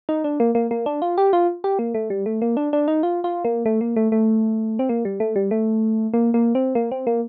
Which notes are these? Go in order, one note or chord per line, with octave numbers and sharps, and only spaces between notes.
D#4
D4
A#3
A#3
A#3
D4
F4
G4
F4
G4
A#3
A3
G3
A3
A#3
D4
D4
D#4
F4
F4
A#3
A3
A#3
A3
A3
C4
A#3
G3
A3
G3
A3
A#3
A#3
C4
A#3
C4
A#3